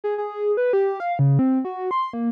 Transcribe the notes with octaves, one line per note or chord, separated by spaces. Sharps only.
G#4
G#4
B4
G4
F5
C#3
C4
F#4
C6
A#3